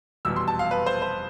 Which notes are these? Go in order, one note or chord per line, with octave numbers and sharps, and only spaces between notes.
F1 E2 B2 G3 E6
C6
A5
F5
B4
C5
C5